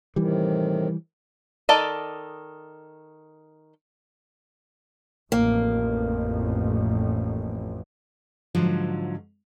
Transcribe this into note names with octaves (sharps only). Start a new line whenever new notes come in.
A2 C3 D#3 E3 G3
D#3 A4 D5 D#5
A1 F2 A#3
G#2 D3 F3 F#3